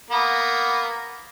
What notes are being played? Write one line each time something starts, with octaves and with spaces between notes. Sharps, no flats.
A#3 B3